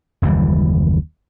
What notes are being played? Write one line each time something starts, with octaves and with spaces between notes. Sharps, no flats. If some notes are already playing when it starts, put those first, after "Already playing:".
F#1 D#2 E3 G3